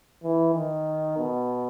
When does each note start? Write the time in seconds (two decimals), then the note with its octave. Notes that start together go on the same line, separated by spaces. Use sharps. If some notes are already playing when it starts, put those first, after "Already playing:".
0.24 E3
0.55 D#3
1.18 B2